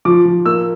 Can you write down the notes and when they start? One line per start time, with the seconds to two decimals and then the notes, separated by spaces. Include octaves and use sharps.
0.05 F3 D6
0.25 F3
0.45 A#3 E6